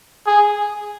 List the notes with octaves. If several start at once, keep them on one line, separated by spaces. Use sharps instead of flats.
G#4